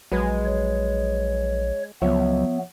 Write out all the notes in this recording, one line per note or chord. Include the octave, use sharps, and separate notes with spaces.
A#1 F#3 G#3 B4 G#6
C#5
C#2 F3 F#3 B3 C#5 E5